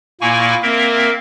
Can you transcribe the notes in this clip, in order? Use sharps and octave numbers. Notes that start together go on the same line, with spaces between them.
A#2 A#3 E4 G#5 C#6
A#3 C4 A#4 E5